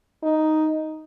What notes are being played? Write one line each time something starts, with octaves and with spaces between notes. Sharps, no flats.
D#4